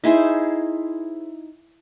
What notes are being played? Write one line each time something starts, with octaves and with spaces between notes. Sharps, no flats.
D#4 E4 G#4 C5